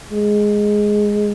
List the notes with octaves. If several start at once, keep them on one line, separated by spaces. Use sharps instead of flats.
G#3